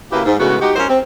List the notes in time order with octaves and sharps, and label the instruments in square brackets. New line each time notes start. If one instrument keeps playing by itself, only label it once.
[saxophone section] C#3 A#3 E4 F#4 G4 B4
G#2
A2 C#3 G#3 B3 F#4
G#3 D#4 F#4 G4
F#3 C#4 E4 A#4 C5
C4